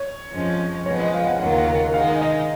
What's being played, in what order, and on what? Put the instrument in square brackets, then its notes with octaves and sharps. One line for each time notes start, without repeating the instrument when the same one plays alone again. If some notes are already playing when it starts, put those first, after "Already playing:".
Already playing: [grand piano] C#5
[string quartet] F2 F3 G#3 C#4
[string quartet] F3 G#3 B3 [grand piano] C#5
[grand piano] D#5
F5
F#5
[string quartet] D#2 C#3 F#3 A#3 F4 [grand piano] F#5
[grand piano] F#5
F#5
[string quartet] D#3 G#3 D#4 [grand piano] F5
[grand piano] D#5